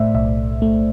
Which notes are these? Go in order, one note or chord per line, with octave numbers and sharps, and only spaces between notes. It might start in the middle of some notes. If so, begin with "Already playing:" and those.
Already playing: A2 A3 C5 D5 E5
B1 E5
A3